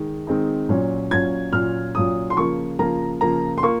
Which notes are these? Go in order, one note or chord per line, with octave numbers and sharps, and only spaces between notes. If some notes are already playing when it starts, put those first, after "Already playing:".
Already playing: D#3 G#3
D#3 G#3 C4 D#4
A#2 F#3 C#4 F4
A#2 F#3 C#4 F4 G#6
A#2 F#3 C#4 F4 F6
A#2 F#3 C#4 F4 D#6
C6
C#3 F3 A#3 F4 C#6
C#3 F3 A#3 F4 A#5
C#3 F3 A#3 F4 A#5
C6
A#3 F4 C#6